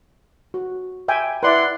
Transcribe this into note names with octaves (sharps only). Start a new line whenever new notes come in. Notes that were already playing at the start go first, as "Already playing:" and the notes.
F#4
E5 G5 G#5
E4 B4 D5 F#5 C6